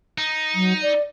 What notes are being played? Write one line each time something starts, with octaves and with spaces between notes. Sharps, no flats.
D#4
F#3
D5